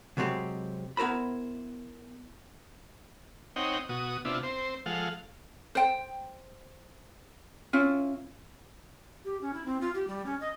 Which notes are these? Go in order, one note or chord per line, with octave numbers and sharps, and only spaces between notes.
C3 F#3 G#3 C4 G4
B3 E4 A#4 C5 B5
C4 D#4 C#5 D#5 F#5 G5
B2 F#4 D#6
C3 B3 D4 E4 F4
C4 C5
F3 G#3 A4 F5 F#5
C5 G5
C#4 E4 F4
G4
C#4
E4
C4
F4
G4
G3
C#4
D#5